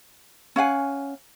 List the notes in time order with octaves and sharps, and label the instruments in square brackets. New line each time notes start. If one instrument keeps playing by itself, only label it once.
[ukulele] C#4 F5 F#5 G#5